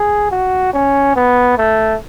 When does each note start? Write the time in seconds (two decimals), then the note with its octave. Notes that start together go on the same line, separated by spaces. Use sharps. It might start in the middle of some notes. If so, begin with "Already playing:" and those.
Already playing: G#4
0.31 F#4
0.73 C#4
1.15 B3
1.58 A3